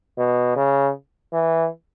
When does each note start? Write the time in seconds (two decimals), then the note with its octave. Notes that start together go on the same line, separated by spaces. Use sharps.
0.18 B2
0.56 C#3
1.33 E3